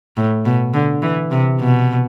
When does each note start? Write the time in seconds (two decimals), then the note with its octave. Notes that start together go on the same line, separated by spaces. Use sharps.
0.17 A2
0.45 B2
0.74 D3
1.02 E3
1.31 C3
1.60 B2